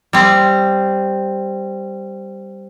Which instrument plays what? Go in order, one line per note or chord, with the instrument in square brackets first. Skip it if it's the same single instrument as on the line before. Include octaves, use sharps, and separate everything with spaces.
[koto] G3 C4